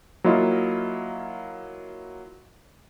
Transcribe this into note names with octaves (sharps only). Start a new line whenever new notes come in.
F#3 A#3 E4 F4 D#5